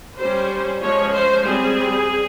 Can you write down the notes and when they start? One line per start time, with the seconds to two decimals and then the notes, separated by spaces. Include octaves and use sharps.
0.19 G3 C#4 C5
0.81 F3 G#3 C#4 C#5
1.13 C5
1.44 G3 C4 G#4